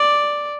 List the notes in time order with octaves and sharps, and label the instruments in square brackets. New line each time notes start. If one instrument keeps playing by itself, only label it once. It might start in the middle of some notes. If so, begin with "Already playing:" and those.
Already playing: [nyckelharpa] D5